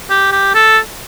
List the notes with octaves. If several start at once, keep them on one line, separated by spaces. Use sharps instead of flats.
G4
G4
A4